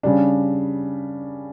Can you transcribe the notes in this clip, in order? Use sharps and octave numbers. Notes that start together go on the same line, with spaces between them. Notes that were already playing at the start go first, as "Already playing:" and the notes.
C#3 G3 D4